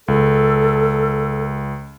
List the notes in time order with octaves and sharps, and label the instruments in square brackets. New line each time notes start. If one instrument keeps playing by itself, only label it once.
[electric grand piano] C#2 [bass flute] A4